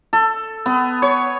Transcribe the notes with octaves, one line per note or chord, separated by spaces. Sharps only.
A4
B3
C#5